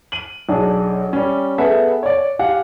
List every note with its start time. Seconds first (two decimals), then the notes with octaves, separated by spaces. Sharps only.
0.12 D#7 F#7
0.49 B1 D4 G#4
1.13 G3 C#4
1.58 B3 G#4 A4 E5 F#5
2.03 C#5 D5
2.39 G4 F5 F#5 G#5